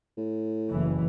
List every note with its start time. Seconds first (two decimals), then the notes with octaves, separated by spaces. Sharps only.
0.18 A2
0.71 F#1 E3